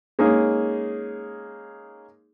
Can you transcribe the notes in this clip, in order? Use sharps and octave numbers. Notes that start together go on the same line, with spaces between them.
G#3 A#3 C#4 D#4 G#4